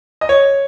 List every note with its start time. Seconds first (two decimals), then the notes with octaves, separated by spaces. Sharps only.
0.21 D#5
0.29 C#5